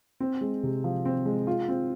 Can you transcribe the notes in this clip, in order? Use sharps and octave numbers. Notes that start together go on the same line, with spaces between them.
C4
G#3
C3
F3
C4
G#3
F4
C4